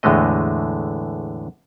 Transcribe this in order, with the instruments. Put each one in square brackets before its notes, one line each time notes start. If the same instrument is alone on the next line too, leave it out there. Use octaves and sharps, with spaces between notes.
[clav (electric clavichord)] E2 A2 D3 G#3 A3 D#5